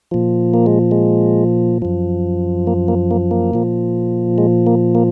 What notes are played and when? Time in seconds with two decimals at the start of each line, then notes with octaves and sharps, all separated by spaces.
0.11 A#2 F3
0.54 A#3
0.66 G#3
0.91 G#3
1.82 F#2 F3
2.67 A#3
2.88 A#3
3.11 A#3
3.31 A#3
3.54 A#2 F3
4.38 G#3
4.67 A#3
4.95 A#3